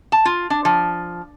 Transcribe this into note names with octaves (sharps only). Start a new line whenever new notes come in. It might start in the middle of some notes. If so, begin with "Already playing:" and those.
A5
F4
D4
F3